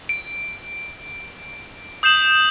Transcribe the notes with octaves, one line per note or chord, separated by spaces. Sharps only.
D7
D#6 G6 C7 E7 F#7